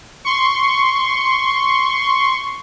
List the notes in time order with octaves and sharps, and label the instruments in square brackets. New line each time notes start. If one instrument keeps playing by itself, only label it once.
[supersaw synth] C6 C#6